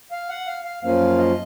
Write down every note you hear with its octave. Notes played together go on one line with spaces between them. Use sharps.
F5
F#5
F5
F5
F#2 F3 A#3 C#4 F4 F5
D#5